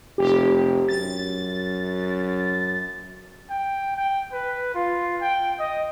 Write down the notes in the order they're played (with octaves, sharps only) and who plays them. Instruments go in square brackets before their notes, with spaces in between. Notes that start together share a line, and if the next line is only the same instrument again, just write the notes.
[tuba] F1 [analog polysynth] G4
[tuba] F#2 [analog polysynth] A6
[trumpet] G5
G5
B4
F4
G5
D#5